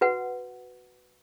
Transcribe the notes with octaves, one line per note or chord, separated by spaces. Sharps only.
F#4 B4 F#5